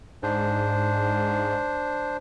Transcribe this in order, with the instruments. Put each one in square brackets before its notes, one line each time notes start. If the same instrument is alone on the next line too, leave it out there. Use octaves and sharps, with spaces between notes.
[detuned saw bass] G#2 [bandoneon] D4 C5